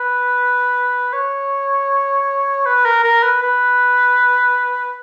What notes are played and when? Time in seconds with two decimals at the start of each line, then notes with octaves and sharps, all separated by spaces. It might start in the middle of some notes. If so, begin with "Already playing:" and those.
Already playing: B4
1.13 C#5
2.66 B4
2.85 A#4
3.04 A#4
3.23 B4
3.42 B4